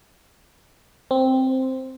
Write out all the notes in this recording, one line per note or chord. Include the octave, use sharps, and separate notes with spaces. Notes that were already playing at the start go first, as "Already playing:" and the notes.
C4